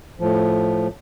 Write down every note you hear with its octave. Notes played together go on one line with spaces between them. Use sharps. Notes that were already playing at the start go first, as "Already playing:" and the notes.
A2 F3